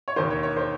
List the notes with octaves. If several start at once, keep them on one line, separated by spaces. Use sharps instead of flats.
C#5
E1 D#2 D#3 C5
C#5
C#5
C5